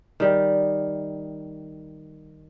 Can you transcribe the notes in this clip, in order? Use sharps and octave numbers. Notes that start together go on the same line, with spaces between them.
D#3 G3